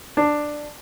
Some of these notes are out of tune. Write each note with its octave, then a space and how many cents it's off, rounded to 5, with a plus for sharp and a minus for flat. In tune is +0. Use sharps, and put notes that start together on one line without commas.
D4 +10